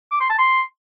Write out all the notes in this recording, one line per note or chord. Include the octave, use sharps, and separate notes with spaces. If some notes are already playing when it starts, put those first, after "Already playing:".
D6
C6
A5
C6